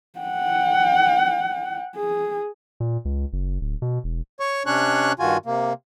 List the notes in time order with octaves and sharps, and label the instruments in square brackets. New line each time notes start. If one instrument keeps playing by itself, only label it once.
[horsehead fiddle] F#5 G5
G#4
[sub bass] A#2
C#2
F#1
D1
B2
E1
[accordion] C#5 C#6
C3 C#4 D4 C#5 C#6 F#6
G2 D#3 F4 F#4 G#5
C3 A#3